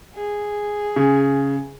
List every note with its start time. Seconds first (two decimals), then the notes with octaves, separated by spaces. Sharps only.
0.15 G#4
0.96 C#3